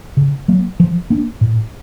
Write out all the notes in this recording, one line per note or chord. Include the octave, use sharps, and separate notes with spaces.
C#3
F#3 A#3
F3
A#3 D4
A2